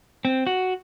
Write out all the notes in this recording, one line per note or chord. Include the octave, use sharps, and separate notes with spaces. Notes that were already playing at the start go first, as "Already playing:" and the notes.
C4
F#4